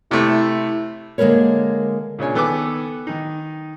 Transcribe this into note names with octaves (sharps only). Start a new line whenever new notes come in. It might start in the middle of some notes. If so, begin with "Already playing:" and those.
C3 A3 E4
D3 G#3 A#3 A#4 B4 C#5
A#2 C#3 D4 C#5 G#5
D#3 B3 A4 B4 G#5 D6
D#3 D#4